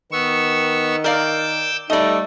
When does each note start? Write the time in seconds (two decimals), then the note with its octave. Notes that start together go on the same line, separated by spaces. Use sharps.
0.12 D#3 B3 C#6 E6
1.04 A#4 D5 F5 D6 E6 G6
1.90 G3 A3 D#4 D5 D#5